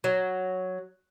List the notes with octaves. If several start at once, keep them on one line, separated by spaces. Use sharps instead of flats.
F#3